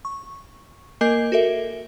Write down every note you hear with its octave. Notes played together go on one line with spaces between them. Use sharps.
C#6
A#3 A#4 D#5 G#5 G6 C7
F#4 A4 A#4 E5